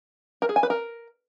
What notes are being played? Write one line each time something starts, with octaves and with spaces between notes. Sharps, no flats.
A#4
G#4
G#5
B4
A#4